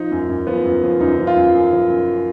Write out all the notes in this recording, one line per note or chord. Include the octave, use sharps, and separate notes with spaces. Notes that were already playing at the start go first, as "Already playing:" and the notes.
Already playing: F3 D#4
F#2
F#2
F3 B3
F#2
F3
F#2 D#4
F3
F4
F#2
F#2
F3
F#2